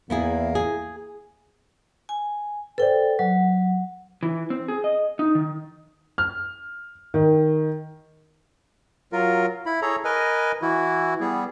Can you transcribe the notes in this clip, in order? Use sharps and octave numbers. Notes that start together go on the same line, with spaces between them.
E2 A#3 B3 E4 G#4
G#4
G#5
A4 B4 C5 D5 G5
F#3 F#5
E3
C4
G#4
D#5
D#4
D#3
F6
D#3
F#3 F4 A#4
E4 B5
G#4 A4 C#5 A#5
A#4 B4 D#5 G#5
E3 E4 F#4
G3 B3 G#4